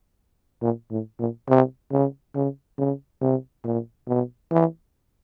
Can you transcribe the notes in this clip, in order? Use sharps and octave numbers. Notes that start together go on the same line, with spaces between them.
A#2
A2
A#2
C3
C#3
C#3
C#3
C3
A#2
B2
E3